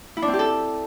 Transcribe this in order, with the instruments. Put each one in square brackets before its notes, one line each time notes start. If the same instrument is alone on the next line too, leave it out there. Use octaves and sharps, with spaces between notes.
[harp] E4
D4
C4
G4
A4